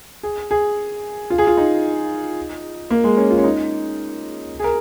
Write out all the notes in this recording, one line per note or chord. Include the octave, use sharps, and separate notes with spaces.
G#4
G#4
F4
G#4
F4
D#4
A#3
G#3
C#4
F4
C#4
D#4
G#4
A#4